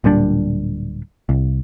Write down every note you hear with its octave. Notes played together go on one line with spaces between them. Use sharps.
D1 A#2 G3 D4
C2